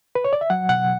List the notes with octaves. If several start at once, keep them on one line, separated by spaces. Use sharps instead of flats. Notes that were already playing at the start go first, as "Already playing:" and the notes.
B4
C#5
D5
E5
F#3 F#5
B2 F#5